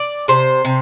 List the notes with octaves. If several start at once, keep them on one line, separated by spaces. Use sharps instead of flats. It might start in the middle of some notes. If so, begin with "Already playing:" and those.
Already playing: D5
C3 C5
C3